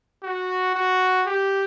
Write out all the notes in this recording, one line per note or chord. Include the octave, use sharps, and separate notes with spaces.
F#4
F#4
G4